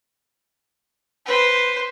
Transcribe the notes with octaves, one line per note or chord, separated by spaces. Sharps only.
B4 C5